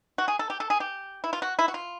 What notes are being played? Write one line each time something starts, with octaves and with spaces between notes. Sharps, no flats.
F#4
G#4
A4
G4
A4
G#4
G4
E4
F4
F#4
E4
F#4
F4